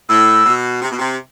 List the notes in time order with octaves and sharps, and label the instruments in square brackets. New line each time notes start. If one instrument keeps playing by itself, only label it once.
[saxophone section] A2 [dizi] E6
[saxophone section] B2
C3
B2
C3